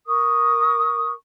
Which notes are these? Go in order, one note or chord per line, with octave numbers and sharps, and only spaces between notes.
A#4 C#6 D#6